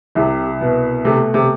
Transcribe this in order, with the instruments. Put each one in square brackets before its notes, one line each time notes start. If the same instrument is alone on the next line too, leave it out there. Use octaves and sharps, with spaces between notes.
[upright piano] C2 [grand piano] C3
[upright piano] B2
[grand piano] C3 [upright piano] A3
[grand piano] C3